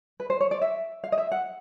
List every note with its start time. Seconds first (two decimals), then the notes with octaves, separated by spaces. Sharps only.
0.20 B4
0.30 C5
0.41 C#5
0.51 D5
0.62 E5
1.04 F5
1.12 D#5
1.18 E5
1.32 F#5